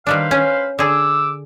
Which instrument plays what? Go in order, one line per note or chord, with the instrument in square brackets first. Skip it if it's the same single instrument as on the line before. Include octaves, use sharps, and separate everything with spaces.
[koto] D#3 G3 D4 [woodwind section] B4 C5 F5
[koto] C#4
[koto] D3 G#4 [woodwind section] D6 E6